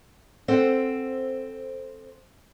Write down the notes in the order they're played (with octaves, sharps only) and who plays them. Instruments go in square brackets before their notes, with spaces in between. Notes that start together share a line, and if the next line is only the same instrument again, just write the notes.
[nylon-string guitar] C4 A4 C5 F#5